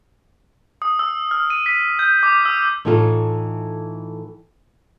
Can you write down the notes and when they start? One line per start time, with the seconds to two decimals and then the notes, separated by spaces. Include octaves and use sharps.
0.82 D#6
0.99 E6
1.31 F6
1.50 D#7
1.66 B6
1.99 G6
2.23 D6
2.45 E6
2.85 A2 E3 D#4 F4 A4